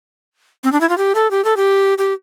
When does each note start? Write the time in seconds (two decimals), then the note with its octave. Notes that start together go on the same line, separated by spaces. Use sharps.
0.64 C4
0.72 D4
0.81 E4
0.89 F4
0.98 G4
1.15 A4
1.31 G4
1.45 A4
1.57 G4
1.98 G4